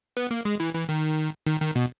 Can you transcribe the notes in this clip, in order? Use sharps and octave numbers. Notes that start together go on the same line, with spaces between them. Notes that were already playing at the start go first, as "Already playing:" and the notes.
B3
A#3
G#3
E3
E3
D#3
D#3
D#3
B2